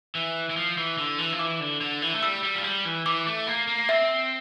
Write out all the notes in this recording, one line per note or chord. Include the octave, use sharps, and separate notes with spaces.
E3
E3
F3
E3
D3
E3
F3
E3 D6
D3
D3
E3
A3
G3 E6
G3
F3
G3
E3
E3 D6
A3
A#3
A#3
C4 E5